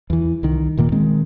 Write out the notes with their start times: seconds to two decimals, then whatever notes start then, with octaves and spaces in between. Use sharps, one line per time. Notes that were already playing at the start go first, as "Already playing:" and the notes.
0.10 E2 E3
0.43 C2 D#3
0.77 D#1 A#2 D#3 A#3
0.92 D#3 G#3 C4